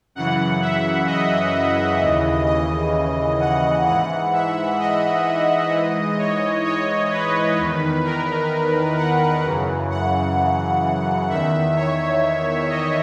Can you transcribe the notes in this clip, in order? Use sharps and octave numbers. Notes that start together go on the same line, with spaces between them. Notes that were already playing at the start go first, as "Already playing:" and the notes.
F#2 C#3 E3 F#5
E5
D#5
D#2 C#3 E3
D#5
F#5
G#2 E3 F#5
E5
D#5
G#2 E3
C#5
C#5
B4
E2 D#3
A#4
F#5
F#2 C#3 E3
F#5
E2 D#3 E5
C#5
D#5